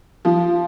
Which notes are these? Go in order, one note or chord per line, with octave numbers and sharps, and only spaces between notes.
F3